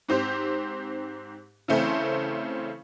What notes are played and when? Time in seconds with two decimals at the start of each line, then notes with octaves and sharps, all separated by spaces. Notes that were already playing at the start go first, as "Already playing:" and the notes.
0.09 G#2 C4 G4 C5
1.68 C#3 E3 A3 C4